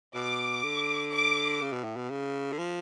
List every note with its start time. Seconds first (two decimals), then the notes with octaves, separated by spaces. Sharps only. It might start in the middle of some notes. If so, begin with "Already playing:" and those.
0.15 B2 D6
0.63 D3
1.13 D6
1.61 C#3
1.73 B2
1.84 A2
1.96 B2
2.10 C#3
2.52 D3
2.59 F3